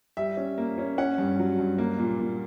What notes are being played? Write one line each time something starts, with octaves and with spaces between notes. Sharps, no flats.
G3 E5
C#4
A#3
C#4
C#4 F#5
G2
F#3
G2
A#3
A#2
A#2